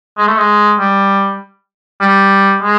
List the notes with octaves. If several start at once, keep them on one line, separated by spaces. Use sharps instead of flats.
G#3
A3
G#3
G3
G3
G#3